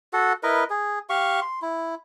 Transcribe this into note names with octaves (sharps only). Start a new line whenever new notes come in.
F#4 A4 F#5
E4 A#4 B4 D#5
G#4
G4 F5 C#6
C6
E4